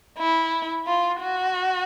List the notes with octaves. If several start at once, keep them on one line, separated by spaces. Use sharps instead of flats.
E4
F4
F#4